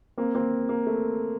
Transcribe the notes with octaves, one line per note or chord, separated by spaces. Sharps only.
A#3 C4
A#3 C4
A#3
A3